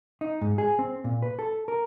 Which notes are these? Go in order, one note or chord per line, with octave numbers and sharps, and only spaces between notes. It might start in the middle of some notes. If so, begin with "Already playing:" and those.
D#4
G#2
G#4
C4
A#2
B4
A4
A#4